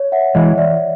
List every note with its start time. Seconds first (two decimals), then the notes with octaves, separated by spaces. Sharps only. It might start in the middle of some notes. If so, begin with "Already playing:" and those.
Already playing: C#5
0.12 E5 F#5
0.35 E3 G#3 D#5 F5
0.58 D5 E5